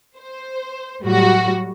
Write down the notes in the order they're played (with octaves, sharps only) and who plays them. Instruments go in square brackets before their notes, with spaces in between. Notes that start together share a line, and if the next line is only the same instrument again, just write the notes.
[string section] C5
A2 F#3 G3 F#4